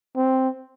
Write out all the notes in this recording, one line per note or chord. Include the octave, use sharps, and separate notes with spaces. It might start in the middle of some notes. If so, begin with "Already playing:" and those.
C4